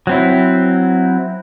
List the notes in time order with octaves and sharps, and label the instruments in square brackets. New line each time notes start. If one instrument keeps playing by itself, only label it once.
[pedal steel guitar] F#3 C4 E4